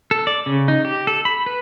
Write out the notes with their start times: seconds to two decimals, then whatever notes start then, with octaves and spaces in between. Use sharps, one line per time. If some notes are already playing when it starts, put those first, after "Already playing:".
0.11 A4
0.27 D5
0.46 C#3
0.68 D#4
0.85 G4
1.07 A4
1.25 B5
1.46 B4